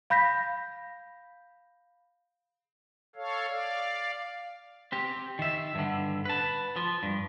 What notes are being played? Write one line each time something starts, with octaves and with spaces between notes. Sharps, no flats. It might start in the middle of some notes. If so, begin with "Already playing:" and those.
F5 B5 G6 A#6 B6
A4 C#5 F5
D5 F5
C4 G4
D#3 E5
G2 D3
B4 A5
F3
G2